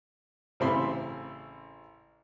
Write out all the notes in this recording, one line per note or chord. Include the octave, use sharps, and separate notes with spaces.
A1 C#3 C4 E4 B5 C6